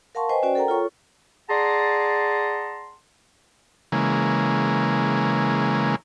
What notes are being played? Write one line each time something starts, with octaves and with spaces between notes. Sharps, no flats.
A#4 F5 F#5 A5 C6 C#6
B4 C5 D#5 G5 G#5
C#4 F#4 C5 D5 G5
A4 A#4 F#5 G5 A#5
F4 A4 C#5 C#6
G#4 D5 F#5 A5 A#5 C6
C#3 E3 G#3 A#3